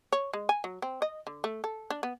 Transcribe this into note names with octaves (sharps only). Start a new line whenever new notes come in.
C#5
G#3
G#5
F#3
C4
D#5
D3
A3
A4
D4
B3